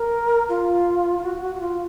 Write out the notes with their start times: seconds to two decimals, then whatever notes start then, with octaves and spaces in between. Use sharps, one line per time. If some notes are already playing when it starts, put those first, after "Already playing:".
Already playing: A#4
0.49 F4
1.19 F4
1.23 F#4
1.41 F#4
1.55 F#4
1.60 F4